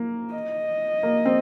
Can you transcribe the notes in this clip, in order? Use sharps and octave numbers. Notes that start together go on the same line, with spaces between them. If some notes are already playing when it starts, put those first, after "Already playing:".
Already playing: A#3
D#5
A#3
C4